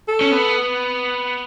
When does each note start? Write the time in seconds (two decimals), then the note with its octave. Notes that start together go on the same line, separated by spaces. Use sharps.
0.09 A4
0.21 C#4
0.32 B3